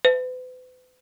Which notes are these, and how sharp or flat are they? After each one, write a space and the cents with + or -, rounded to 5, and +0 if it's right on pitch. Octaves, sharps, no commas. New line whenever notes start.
B4 +45